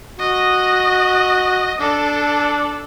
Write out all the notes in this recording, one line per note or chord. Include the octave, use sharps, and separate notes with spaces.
F#4 D#5
D4 A4